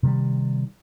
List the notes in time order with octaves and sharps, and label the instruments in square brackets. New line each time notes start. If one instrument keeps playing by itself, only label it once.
[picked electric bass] C3 D#3 F#3 G3